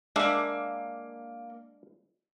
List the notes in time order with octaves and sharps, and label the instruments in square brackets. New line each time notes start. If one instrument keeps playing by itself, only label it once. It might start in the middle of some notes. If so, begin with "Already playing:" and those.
[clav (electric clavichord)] G#3 D4 E5 [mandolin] A#3